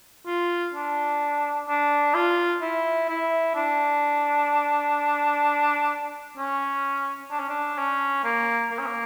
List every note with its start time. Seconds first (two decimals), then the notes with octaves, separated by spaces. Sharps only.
0.26 F4
0.74 D4
1.68 D4
2.14 F4
2.62 E4
3.09 E4
3.55 D4
6.37 C#4
7.31 D4
7.40 C#4
7.49 D4
7.78 C#4
8.24 A#3
8.72 A#3
8.79 C#4
8.87 A#3